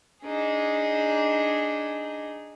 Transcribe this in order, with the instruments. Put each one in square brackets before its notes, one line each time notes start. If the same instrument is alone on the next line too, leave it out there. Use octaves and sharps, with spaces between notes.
[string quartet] D4 D#4 G#4